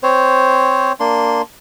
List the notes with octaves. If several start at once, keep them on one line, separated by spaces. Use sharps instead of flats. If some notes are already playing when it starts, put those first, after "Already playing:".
C4 C5 C#5
A#3 D4 C6